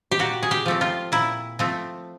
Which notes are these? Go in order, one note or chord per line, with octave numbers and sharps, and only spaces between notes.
G4
A#2 F#4
G#4
G4
F3 A3 C4
F4
A#2 E4
F3 A3 C4